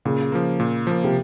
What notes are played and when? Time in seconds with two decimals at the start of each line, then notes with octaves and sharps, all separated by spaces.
0.05 A#2 C#3
0.32 F3 A#3
0.60 A#2
0.87 F3 A#3
1.04 C3